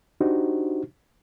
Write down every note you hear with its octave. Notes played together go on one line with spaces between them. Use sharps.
D4 D#4 F#4 G4 C5